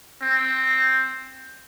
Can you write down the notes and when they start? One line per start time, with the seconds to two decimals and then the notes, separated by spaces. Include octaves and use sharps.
0.22 C4